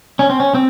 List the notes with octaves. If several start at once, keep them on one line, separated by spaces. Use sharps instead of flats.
C#4
C4
C#4
C4